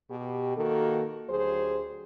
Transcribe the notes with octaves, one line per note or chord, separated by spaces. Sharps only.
B2 G4
D#3 A#3 F#4 A4
D2 F#3 G4 G#4 C5